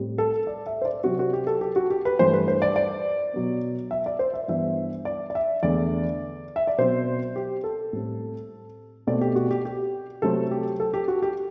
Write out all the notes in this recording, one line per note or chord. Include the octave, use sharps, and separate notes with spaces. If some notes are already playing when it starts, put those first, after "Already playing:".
Already playing: A2 G3 C4
A4
D5
E5
C5
D5
C3 F#3 C4 F#4
F#4
G4
A4
G4
F#4
G4
B4
G2 E3 A3 C5
B4
C5
D5
D5
B2 F#3 B3
E5
D5
C5
E5
G2 E3 B3 E5
D5
D5
E5
E2 D3 A3 D5
E5
D5
B2 F#3 C4 C5
G4
A4
A2 G3 C4
B2 A3 C4 D5
G4
F#4
G4
G4
C3 F#3 A3 C4 A4
G4
A4
G4
F#4
G4